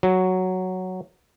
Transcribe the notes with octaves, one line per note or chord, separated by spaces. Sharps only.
F#3